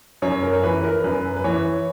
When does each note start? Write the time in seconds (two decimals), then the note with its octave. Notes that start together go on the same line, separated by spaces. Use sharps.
0.22 F#2 C#5
0.43 A#4
0.53 C#5
0.63 E3 B4
0.84 A#4
1.04 F#2 B4
1.36 B4
1.44 E3 C#5